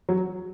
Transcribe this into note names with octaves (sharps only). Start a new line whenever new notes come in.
F#3